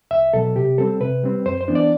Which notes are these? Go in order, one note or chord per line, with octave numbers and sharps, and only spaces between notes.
C2 E5
B2 F#3 A4
C3 G4
G3 C4 A4
C3 B4
G3 C4
F#2 C5
C5
E3 B3 D4
D5